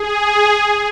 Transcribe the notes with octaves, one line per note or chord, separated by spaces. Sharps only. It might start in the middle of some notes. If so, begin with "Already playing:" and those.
Already playing: G#4
G#4